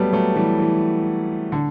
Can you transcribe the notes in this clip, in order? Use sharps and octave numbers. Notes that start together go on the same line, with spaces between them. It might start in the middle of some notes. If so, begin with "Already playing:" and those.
Already playing: F#3 G3 A3 B3
F#3 A3
E3 G3
E3
D3